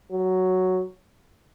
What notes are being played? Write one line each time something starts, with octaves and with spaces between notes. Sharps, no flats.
F#3